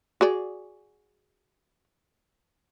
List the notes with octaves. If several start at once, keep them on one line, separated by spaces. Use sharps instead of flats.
F#4 G#4 D5